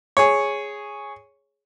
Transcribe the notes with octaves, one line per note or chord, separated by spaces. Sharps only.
G#4 C#5